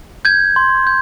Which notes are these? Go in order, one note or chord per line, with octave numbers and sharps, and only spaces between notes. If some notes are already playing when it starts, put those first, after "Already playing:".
G6 G#6
C6
G6